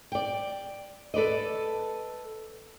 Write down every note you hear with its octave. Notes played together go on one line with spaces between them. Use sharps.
D5 G5
A4 B4 D5 D#5